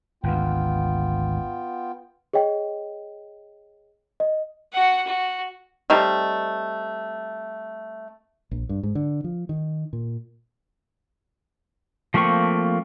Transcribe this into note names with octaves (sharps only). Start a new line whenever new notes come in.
G#1 D2 B3 F4 G5
G#4 C#5 D#5 G5
D#5
F#4 F#5
F#4
G3 A3 C4 D#4
A#1
G2
G#2
D3
F3
D#3
A#2
F3 A3 A#3 C4 C#6